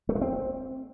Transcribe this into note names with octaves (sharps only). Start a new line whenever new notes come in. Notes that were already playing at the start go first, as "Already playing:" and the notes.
A3
G#3
C4